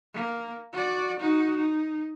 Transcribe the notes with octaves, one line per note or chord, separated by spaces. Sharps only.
A#3
F#4 D5
D#4 F#4
D#4